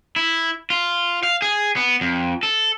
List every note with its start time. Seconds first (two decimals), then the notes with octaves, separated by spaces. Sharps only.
0.16 E4
0.70 F4
1.23 F5
1.42 G#4
1.76 B3
2.01 F2
2.43 A4